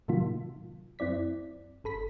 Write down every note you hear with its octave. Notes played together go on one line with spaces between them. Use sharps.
A2 C3 D#3 F#3 A#3 F4
F#2 C4 E4 D5 B6
G1 A4 B5 B6